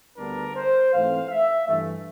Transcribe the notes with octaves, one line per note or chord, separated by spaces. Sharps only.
D2 D3 G3 B3 D4 A#4
C5
G#2 E3 A3 C4 F5
E5
G2 E3 A3